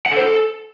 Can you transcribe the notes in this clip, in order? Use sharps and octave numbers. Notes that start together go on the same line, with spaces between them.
F#5
A4
C5
A4